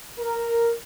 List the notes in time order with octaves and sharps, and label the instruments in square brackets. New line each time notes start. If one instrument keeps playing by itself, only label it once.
[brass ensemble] A#4